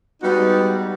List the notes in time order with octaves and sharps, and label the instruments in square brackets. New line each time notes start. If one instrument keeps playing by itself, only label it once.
[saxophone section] G3 G#3 B3 D#4 F#4